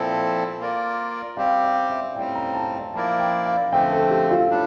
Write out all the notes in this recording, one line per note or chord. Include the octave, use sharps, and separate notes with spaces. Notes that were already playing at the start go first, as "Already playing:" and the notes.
Already playing: A#2 F3 C4 E4 A4
A#3 F4 A#4 D5
G3 C4 G4 F5
F5
E5
A2 G3 C4 G5
A#5
A5
A5
F3 A#3 E4 A#4 D5 A5
G5
F5
D3 F3 A3 C4 G5
A4
G4
F4
A2 G3 D4